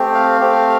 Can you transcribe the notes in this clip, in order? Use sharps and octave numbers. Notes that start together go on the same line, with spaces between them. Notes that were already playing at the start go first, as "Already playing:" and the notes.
Already playing: A3 C4 G4
F5
A3 C4 G4